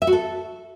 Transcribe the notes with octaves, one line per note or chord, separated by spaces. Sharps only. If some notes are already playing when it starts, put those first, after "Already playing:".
E5
F#4
A4